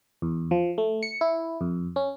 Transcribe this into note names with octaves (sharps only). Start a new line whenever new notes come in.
E2
F3
A3
C#7
E4
F2
C#4